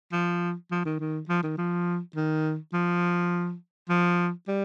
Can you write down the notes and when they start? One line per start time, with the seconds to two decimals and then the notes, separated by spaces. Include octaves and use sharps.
0.13 F3
0.71 F3
0.85 D#3
1.00 D#3
1.29 F3
1.43 D#3
1.58 F3
2.16 D#3
2.73 F3
3.90 F3
4.48 G3